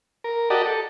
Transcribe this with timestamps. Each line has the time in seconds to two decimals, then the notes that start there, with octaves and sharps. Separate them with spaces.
0.24 A#4
0.50 F#4 G4 A#4 D5 D#5 A5
0.66 A4